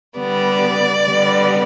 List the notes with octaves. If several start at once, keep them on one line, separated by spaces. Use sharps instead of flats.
D3 G3 B3 D5
D3 G3 B3